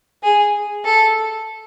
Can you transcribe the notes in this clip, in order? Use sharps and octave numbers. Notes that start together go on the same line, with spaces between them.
G#4
A4